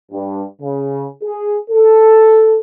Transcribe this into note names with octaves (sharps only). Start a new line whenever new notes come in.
G2
C#3
G#4
A4